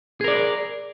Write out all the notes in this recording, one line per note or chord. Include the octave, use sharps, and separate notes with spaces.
G#4 A#4 D5